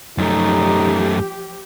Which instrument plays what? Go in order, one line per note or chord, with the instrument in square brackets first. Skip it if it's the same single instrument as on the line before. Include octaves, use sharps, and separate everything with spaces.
[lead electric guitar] F#2 A3 [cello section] F3 G4 [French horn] D#4